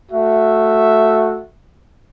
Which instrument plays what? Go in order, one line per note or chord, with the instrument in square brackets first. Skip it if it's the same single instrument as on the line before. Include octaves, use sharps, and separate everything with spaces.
[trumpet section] A3 F#4 E5